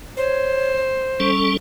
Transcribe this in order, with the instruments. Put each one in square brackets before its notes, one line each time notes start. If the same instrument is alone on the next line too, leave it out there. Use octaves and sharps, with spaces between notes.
[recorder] C5 [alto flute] C#5
[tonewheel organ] G3 C#4 A4 [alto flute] C#6